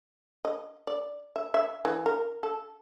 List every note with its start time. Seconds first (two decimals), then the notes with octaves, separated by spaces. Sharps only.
0.45 D#5
0.87 D5
1.36 E5
1.54 E5
1.85 E3
2.06 A#4
2.43 A4